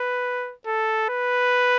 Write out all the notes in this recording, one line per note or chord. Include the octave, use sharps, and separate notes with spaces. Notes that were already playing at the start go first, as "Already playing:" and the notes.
Already playing: B4
A4
B4